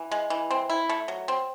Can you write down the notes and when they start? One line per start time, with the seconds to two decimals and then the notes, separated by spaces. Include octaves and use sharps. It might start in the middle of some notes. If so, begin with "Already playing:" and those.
Already playing: E3
0.11 G#3
0.30 E3
0.51 C4
0.70 E4
0.89 A3
1.08 F#3
1.28 C4